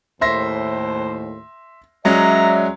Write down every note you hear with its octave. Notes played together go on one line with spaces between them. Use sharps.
D#2 A2 C5 E5 C6 A#6
F#3 G#3 C#4 D5 E5 A#5